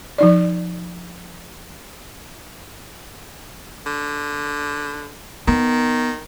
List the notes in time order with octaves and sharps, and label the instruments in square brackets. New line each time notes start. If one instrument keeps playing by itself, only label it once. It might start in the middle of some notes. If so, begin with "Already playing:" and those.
[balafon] F3 D#4 D5
[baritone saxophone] D3
[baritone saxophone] D#3 [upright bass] B3